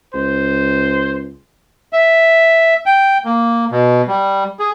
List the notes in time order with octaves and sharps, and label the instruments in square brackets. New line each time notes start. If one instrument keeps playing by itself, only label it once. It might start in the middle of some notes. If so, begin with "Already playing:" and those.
[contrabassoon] C#2 [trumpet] C5
[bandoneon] E5
G5
A#3
B2
G3
G#4